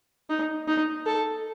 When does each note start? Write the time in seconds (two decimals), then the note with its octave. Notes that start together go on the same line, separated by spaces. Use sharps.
0.30 D#4
0.68 D#4
1.06 A4